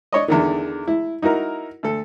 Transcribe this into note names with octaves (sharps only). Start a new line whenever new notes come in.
D4 C#5 D#5
E2 D3 D#3
E4
D#4 E4 F#4 A#4
D2 A4